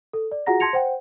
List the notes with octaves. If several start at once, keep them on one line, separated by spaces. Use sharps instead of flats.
A4
D5
F4 F#4 G#4 F#5 A#5 A#6
A5 C6 G#6 A#6 C#7 F7
C5 F#5 G5